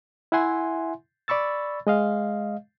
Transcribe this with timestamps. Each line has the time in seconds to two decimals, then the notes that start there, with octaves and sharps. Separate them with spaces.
0.32 E4 E5 F#5 G#5 C6
1.28 D5 B5 C#6 E6 A6
1.87 G#3 D#5 F5